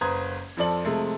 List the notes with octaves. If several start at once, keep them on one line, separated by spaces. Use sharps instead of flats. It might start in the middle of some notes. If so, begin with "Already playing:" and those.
F#1 B4 C5 A#5 D#6 G#6
F2 F3 A4 D5 F#7
C3 F3 G#3 A3